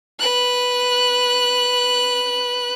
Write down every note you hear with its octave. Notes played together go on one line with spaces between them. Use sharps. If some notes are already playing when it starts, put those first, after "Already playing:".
B4 F#6